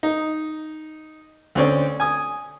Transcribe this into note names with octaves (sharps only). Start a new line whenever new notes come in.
D#4
D2 C4 C#4 D5
G#5 D#6